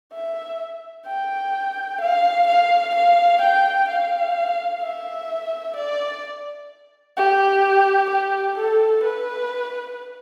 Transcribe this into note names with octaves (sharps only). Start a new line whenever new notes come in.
E5
G5
F5
F5
F5
G5
F5
E5
D5
G4
G4
A4
B4